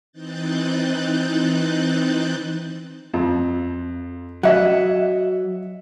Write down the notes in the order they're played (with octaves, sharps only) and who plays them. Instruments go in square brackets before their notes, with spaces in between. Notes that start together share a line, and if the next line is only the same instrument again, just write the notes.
[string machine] E3 C4 D#4 F#6 G6 A6
[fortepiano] F2
[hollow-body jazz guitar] F#3 [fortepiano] D#5 E5 F#5